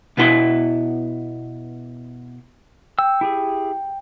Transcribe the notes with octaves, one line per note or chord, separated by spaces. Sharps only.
B2 B3 E4 C6
G5 E6
E4 G4 G#4